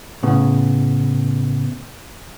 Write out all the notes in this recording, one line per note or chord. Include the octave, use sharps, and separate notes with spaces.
A2 C#3 B3